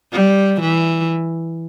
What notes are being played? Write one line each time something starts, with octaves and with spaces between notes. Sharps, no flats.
G3
E3